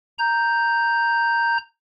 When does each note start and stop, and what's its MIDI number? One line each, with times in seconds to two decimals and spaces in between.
0.19 1.58 82
0.19 1.58 91